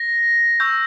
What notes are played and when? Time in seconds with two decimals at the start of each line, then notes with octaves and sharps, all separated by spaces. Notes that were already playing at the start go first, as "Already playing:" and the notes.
Already playing: A#6
0.60 C#6 E6 G6